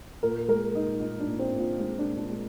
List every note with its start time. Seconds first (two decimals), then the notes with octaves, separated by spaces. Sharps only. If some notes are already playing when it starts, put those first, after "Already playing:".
0.23 A#2 A#4
0.48 G#3 A#4
0.75 A#2 D#4
1.00 A#2 D#4
1.20 D4
1.27 A#2
1.39 C4
1.53 A#2
1.59 F4
1.79 G#3 D4
1.99 D4
2.05 A#2
2.17 D4
2.31 G#3